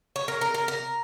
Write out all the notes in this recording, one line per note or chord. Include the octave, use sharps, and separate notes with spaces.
C#5
A#4
A#4
A#4
A#4